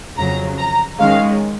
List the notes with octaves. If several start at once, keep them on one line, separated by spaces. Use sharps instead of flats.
F2 C#3 F#3 A#5
A#5
D#3 G#3 C#4 F5